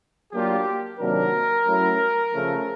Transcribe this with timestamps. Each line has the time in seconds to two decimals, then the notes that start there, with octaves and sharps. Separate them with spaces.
0.32 F#3 A#3 D4 F4 G4
0.99 C3 D#3 F#3 A#3 D4 A#4
1.66 F#3 A3 C#4 E4
2.33 C#3 F3 A3